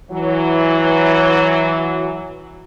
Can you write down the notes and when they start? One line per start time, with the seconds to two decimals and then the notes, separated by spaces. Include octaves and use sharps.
0.11 E3 F#3